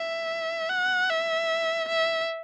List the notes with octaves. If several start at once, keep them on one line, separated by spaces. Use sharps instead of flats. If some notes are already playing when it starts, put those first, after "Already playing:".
Already playing: E5
F#5
E5
E5